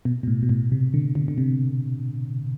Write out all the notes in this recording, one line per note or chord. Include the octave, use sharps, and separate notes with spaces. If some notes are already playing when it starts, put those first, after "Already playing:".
B2
B2
A2
B2
A2
C3
D3
D3
D3
C3